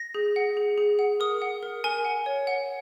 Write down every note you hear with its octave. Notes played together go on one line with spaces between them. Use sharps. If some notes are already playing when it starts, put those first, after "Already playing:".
Already playing: A#6
G#4
F#5
G#4
G#4
F#5
A#4 D#6
F#5
A#4
A#4 G#5
F#5
C#5
F#5